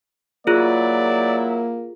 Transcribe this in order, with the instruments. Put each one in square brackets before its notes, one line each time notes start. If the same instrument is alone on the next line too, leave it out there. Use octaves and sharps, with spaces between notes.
[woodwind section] F#3 E4 [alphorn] A#3 [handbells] F4 G#4 [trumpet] D5